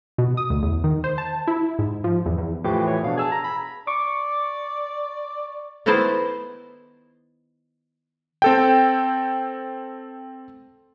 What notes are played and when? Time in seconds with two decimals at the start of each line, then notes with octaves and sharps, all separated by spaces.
0.18 B2
0.37 D#6
0.50 D2
0.63 E2
0.84 D#3
1.04 C5
1.18 A5
1.47 E4
1.79 G#2
2.04 F3
2.26 E2
2.38 E2
2.64 A2 E3 F3 G4
2.87 C#5
3.04 B2 D4 F5
3.17 G#4 A5 E6 G#6
3.32 A#5
3.44 B5
3.87 D5 C#6 D6
5.86 D#3 B3 D#4 E4 C5 D5
8.42 C4 A4 G5